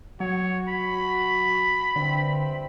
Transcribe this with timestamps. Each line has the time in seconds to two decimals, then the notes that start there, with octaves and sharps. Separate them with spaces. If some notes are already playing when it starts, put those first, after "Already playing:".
0.20 F#3 F#4 C#5
0.68 B5
1.96 G2 D3 E3 C4